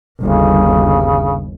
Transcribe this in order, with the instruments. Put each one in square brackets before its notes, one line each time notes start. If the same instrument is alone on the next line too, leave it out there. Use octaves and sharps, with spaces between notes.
[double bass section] G1 D#2 [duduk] C#3